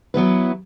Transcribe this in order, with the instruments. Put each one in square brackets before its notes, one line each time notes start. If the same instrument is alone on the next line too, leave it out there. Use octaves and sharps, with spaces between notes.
[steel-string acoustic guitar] F#3 B3 E4 B4